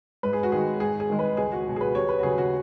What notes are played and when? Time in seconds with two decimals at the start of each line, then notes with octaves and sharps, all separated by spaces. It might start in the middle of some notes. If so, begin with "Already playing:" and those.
0.23 G#2 B4
0.33 G#4
0.43 F#4
0.52 D#3 G#3 G#4
0.80 G#2 G#4
1.00 G#4
1.10 D#3 G#3
1.19 B4
1.37 C#2 G#4
1.52 F#4
1.66 B2 F#3
1.76 G#4
1.81 B4
1.95 D#2 C#5
2.09 B4
2.19 F#4
2.23 C#3 F#3 G#4
2.38 F#4